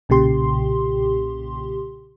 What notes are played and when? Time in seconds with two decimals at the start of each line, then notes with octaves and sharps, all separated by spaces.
0.09 B1 A#2 C#3 G4 C6